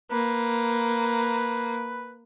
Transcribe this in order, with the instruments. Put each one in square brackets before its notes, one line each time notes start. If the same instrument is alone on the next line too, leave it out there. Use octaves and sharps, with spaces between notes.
[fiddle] A#3 [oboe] B4